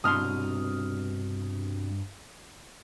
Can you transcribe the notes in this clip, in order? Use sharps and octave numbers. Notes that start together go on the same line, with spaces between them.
C2 G2 B2 C6 D#6 F6